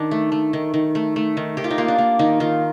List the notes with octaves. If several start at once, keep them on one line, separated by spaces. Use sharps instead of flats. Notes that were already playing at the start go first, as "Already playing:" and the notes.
Already playing: D#3 D4
A3
A3
D#3
D#3
A3
A3
D#3
D#3 G4
F4
D#4
A#3 F4
D4
A#3
D#3 D#4
D#3 F4